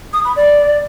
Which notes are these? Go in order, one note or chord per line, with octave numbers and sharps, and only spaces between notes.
D#6
B5
D5